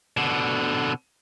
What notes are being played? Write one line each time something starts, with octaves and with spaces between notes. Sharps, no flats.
B2 D3